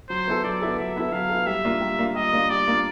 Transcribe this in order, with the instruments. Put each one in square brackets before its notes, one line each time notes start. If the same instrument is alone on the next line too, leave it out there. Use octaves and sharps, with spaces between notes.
[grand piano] F#3 [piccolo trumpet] C5
[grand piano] B3 E4 A4
[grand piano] F#3 [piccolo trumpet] D5
[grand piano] B3 E4 A4
[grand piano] F#3 [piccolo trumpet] E5
[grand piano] B3 E4 A4
[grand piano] F#3 [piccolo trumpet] F5
[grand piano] B3 E4 A4
[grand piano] G3 [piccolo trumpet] E5
[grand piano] A#3 D4 F4
G3
A#3 D4 F4
[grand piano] G3 [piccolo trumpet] D#5
[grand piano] A#3 D4 F4
[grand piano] G3 [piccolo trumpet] D5
[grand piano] A#3 D4 F4